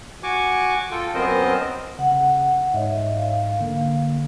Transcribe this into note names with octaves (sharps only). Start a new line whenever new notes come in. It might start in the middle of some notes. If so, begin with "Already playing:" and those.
F#4 G#5 C#6 D6
F4 A4 G5
F#2 B3 C4 A#4 C5 D#5
C#3 F#5
G#2 C#5 D#5 E5
F5
D3 A#3